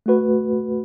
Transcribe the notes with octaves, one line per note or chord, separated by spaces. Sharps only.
A3 F#4 B4